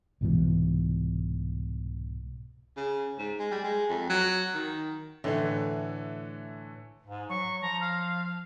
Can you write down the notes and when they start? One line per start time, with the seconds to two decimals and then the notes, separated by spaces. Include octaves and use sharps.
0.21 C2 G#2 B2 E3
2.77 C#3
3.18 G#2
3.39 G#3
3.51 G3
3.64 G#3
3.90 F2
4.10 F#3
4.54 D#3
5.24 A2 D3 E3 A3
7.07 G#2
7.29 F#3 C#6
7.62 F3 A#5
7.81 F5